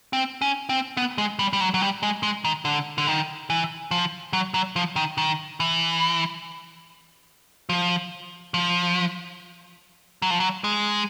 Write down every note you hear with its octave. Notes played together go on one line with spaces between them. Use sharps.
C4
C#4
C4
B3
G#3
G3
G3
F#3
F#3
G3
G#3
G#3
D#3
D3
D3
D#3
E3
F3
F#3
F#3
F3
D#3
D#3
E3
F3
F3
F#3
F3
F#3
G#3